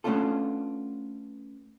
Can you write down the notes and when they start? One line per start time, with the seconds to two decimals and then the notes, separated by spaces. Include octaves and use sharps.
0.04 A3 B3 C#4 D4 F4 A4